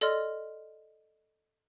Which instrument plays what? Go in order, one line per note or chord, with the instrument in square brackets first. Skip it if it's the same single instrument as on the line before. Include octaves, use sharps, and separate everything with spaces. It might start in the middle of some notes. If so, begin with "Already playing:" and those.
[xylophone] A4 D5 D#5 C6 F6